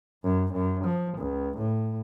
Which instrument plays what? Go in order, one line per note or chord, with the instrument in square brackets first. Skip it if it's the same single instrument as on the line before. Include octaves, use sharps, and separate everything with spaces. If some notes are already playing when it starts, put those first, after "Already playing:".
[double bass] F#2
F#2
F3
C#2
A2